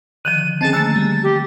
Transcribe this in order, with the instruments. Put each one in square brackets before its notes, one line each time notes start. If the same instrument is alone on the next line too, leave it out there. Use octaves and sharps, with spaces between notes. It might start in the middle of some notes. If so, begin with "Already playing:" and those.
[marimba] D3 D#3 F3 [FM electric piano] F#6 [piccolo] D#7
[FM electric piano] C4 C#4 G#4 [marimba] D#5 [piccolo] A5
[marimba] D3 A3 A#3 [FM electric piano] G#5 E6 [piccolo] A6
[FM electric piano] G3
[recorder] G4